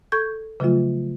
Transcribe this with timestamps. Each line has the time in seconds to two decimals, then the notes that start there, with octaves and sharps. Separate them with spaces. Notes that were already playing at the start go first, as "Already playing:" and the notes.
0.12 A4 C#6 G6 G#6
0.60 C#3 F3 F#3 A3 F4